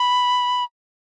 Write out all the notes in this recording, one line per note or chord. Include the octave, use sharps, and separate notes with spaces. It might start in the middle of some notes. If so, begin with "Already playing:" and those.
Already playing: B5